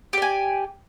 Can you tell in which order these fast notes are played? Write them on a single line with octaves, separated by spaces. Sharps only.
G4 D5 G#5